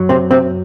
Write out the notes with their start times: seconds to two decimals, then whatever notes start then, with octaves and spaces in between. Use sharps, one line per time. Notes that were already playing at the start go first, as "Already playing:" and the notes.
Already playing: F#2 F#3
0.09 C3 C4
0.31 C3 C4